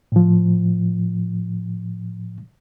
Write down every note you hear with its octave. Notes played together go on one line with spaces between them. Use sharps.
A2 F3